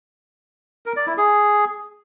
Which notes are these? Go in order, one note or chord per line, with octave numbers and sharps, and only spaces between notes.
A#4
D5
E4
G#4